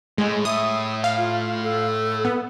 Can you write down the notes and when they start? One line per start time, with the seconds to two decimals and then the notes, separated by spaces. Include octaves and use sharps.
0.18 A2 G#3
0.45 E5 D#6
1.04 F5
1.18 F4
1.63 A4
2.25 B3